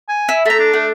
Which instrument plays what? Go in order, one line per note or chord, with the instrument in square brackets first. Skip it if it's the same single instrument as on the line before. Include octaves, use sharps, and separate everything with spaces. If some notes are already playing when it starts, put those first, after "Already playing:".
[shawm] G#5
[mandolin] E4
[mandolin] A3 A#5 [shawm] E5
[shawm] D4
[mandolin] A3